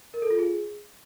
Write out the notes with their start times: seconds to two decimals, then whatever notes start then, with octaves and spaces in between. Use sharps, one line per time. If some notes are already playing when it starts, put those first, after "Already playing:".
0.14 A#4
0.22 A4
0.30 F4
0.39 G#4